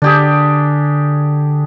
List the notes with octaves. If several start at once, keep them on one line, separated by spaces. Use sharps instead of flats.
D3 D4 G4 G#4